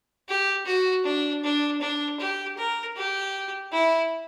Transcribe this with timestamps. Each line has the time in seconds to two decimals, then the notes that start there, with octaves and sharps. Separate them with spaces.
0.28 G4
0.66 F#4
1.05 D4
1.43 D4
1.81 D4
2.19 G4
2.57 A#4
2.96 G4
3.72 E4